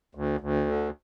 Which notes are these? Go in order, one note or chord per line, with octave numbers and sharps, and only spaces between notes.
D2
D2
D3